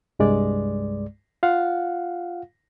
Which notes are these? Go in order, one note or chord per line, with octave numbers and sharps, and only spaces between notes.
C2 G2 G#3 D5
F4 F5 F#5